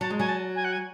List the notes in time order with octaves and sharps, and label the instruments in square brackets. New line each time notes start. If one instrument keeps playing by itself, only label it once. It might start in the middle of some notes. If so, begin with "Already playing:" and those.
[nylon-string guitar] F#3 [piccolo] A5
[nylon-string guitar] G#3
[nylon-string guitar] F#3 [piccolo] G#5
[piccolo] A5
G#5
F#5
G#5